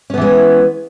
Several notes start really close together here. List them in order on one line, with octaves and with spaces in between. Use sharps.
C#4 B3 E3 G#3